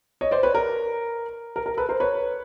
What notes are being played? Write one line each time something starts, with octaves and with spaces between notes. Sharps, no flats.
C#5 D#5
C5 D5
B4 C#5
A#4
A#4
A#4
A4 B4
A#4 C5
B4 C#5